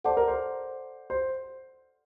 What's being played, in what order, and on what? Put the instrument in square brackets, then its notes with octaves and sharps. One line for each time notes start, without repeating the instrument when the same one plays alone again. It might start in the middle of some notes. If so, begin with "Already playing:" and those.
[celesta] A4 D5 F#5 A5 D6 [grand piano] C5
[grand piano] A#4
C5
C5